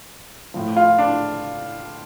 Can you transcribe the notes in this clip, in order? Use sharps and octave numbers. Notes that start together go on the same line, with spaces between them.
A2 F3
F4
D4